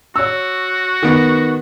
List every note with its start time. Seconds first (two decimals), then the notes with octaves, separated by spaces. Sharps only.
0.16 F#4 C#5 E6
1.03 D#3 B3